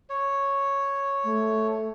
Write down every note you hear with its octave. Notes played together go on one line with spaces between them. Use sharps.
C#5
A3